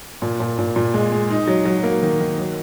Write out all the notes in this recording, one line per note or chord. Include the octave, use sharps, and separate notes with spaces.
A#2
A#2
A#2
A#2
G#3
G#3
D#4
F#3
F#3
A#3
D#3
D#3
F#3